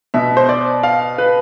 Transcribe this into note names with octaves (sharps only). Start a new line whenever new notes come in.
B2 E5
C5
D5
F5
B4